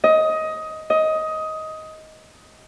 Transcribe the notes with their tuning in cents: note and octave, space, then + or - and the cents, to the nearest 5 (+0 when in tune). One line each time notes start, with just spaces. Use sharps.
D#5 +15
D#5 +15